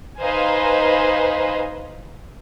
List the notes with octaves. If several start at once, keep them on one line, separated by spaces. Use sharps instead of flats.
D#4 B4 C5 D#5 F5 G#5